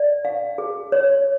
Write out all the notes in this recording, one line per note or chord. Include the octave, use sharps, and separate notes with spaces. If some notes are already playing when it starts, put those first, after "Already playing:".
Already playing: D5
F5
G#4
C#5